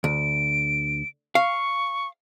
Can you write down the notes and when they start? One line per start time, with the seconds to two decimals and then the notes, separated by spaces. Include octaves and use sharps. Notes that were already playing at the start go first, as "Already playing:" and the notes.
0.04 D2 D7
1.35 F5 C#6